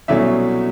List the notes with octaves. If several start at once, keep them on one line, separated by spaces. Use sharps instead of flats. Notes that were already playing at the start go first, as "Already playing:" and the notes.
C2 B2 F#3 A3 C#4 D5 E5